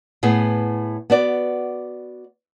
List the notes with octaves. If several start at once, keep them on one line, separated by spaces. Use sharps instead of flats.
A2 B3 G#4
B3 F#4 D5